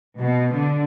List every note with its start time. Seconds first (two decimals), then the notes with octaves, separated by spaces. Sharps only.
0.20 B2
0.52 D3